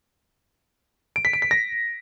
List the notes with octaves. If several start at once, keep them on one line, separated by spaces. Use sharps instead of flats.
D7
B6
D7
B6
A#6